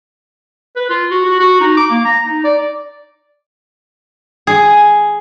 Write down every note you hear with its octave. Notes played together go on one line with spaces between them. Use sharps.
B4
F4
F#4
F#4
F#4
D#4
D6
A#3
A#5
D#4
D5
G#4